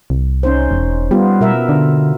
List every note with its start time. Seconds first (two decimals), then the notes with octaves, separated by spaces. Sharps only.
0.10 C2
0.43 C#4 D#4 C5
0.71 E1
1.11 G3 B3 F4
1.41 B2 A#4 E5
1.69 D3